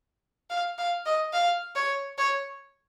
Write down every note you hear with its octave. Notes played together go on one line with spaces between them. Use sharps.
F5
F5
D#5
F5
C#5
C#5